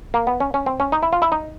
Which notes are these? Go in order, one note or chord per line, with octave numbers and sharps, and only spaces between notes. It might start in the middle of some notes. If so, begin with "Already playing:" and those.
A#3
B3
C#4
C#4
C4
C#4
D#4
E4
F4
E4
D#4